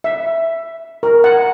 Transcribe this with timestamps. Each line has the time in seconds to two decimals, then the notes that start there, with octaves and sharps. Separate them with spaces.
0.04 E5
1.03 A#4
1.24 F#5